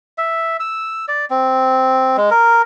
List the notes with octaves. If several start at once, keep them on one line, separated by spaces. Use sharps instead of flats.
E5
E6
D5
C4
G#3
A#4